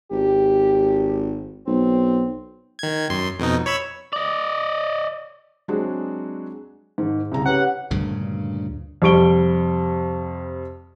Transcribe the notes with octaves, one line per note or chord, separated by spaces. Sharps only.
G#1 G4
B1 C4
D#3 G#6
F#2 C6
F2 B2 D#4
C#5 B5 E6
D5 D#5
F#3 G#3 C4 D4 F#4 G#4
G#2 D#3
C2 C#3 A#5
C#4 G4 B4 F#5
D2 G2 A#2 C#3
F2 C3 G3 C#6 D7 G7